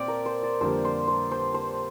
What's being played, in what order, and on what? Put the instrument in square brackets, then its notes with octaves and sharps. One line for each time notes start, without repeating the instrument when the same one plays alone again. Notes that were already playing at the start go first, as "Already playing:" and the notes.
Already playing: [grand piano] A#2 C4 G4 [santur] C5 D5
[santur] A#4
C5
D5
[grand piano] F2 D3 G3 A#3 G4 [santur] C5
[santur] C5
C5
C5
C5